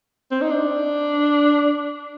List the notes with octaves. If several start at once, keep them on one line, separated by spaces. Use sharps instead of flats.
C4
D#4
D4